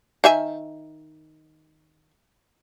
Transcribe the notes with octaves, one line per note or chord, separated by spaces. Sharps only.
D#3 E5 G#5